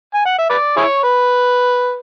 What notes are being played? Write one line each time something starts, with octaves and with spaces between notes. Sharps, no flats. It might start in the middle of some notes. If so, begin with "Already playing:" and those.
G#5
F#5
E5
B4 D5
E4 G#4 C#5
B4